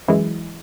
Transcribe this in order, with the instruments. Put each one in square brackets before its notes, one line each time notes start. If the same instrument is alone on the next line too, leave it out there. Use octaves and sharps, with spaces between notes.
[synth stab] F#2 E3 G#3